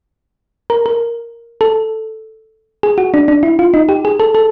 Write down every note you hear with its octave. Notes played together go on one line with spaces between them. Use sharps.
A#4
A#4
A4
G#4
F#4
D4
D4
E4
F4
D#4
G4
G#4
A4
A4